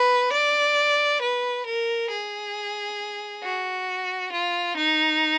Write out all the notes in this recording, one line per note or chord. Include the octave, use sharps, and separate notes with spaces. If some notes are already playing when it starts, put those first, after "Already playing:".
Already playing: B4
D5
B4
A#4
G#4
F#4
F4
D#4